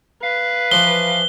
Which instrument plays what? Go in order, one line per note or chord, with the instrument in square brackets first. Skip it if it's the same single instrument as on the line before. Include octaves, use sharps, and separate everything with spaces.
[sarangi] B4 [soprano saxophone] F5
[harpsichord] E3 F3 [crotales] G7